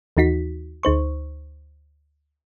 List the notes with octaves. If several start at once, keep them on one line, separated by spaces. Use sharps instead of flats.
D#2 E3 D#4 F#4 B6
D2 D#4 C5 C#6